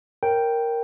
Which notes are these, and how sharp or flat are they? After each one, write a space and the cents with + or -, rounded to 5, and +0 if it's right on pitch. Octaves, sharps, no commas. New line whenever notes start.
A#4 +0 C#5 -30 G5 +0